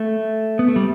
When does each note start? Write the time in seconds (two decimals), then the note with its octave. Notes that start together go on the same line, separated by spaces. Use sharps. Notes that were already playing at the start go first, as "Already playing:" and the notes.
Already playing: A3
0.59 B3
0.68 A3
0.76 G3